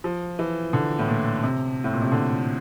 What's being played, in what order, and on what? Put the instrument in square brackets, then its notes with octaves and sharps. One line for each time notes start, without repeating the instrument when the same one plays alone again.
[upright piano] F3
E3
D3
A2
A#2
C3
A2
A#2
C3
D3